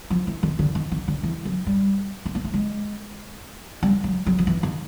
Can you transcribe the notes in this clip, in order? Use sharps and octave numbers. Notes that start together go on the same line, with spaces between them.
F3
E3
D#3
D3
D#3
D#3
D3
E3
F#3
G3
B3
A#3
A3
G#3
G3
F#3
F#3
F3
E3
D#3